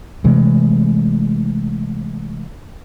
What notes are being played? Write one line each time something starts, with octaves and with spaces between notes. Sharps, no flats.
C3 E3 G#3 A3